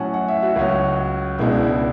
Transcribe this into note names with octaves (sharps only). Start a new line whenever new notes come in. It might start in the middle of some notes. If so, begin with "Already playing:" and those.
Already playing: A2 F#3 C#4 F#5 G#5 A5
F#5
E5
F#4
C#2 C#3 F#3 C#4
C#2 B2 G#3 D4 E4
E4